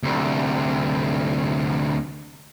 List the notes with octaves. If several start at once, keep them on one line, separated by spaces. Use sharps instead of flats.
D2 C3